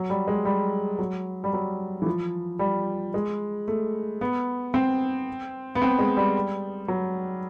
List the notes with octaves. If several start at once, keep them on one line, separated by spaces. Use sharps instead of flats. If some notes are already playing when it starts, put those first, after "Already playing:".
Already playing: F#3
G3
G#3
G3
F#3
G3
F#3
E3
F3
G3
G#3
A3
B3
C4
B3
C4
G#3
G3
F#3